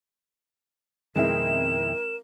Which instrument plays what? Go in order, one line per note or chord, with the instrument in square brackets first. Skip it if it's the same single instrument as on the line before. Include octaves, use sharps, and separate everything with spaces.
[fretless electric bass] F2 B2 D#3 [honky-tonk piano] G#3 C4 E4 [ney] A#4 [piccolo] E7